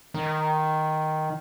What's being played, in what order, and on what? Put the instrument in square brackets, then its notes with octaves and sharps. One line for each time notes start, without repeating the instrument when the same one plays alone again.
[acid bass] D#3